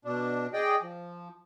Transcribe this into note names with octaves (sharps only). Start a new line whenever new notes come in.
B2 D4
G#4 D5 D#5 G5
F3